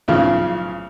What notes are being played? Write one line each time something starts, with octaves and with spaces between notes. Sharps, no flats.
B1 A2 C#3 F3